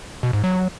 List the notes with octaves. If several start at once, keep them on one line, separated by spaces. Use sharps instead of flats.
B2
G#2
F#3